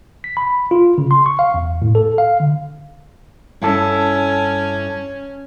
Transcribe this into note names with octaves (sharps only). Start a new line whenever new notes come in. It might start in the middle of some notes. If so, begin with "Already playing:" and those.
B6
B5
F4
C#3
C6
C#6
F5
E2
A2
A4
F5
D3
G2 C#4 E4 A4